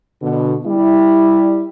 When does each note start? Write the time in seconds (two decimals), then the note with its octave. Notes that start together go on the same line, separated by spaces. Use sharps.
0.22 B2 D3
0.66 G3 E4